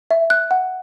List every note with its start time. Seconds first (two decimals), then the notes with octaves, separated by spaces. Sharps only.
0.11 E5
0.30 F#6
0.51 F#5